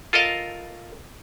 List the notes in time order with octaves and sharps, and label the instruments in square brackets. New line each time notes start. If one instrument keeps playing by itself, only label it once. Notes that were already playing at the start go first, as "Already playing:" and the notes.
[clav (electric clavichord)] F4 A4 A#4 D#5 F5